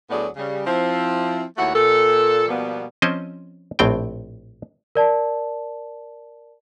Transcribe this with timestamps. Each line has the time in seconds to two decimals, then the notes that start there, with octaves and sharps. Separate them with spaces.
0.10 D2 A2 F#3 B3 G#4 D5
0.36 C#3 G3
0.66 F3 C4 E4
1.57 D#2 A3 E4 F#4 C#5 F#5
1.74 A#2 A4
2.48 B2 F3 G3 A#3 B3
3.02 F3 C4 C#4 C5 D#5
3.79 A#1 A2 C4 G5
4.95 A#4 D5 A5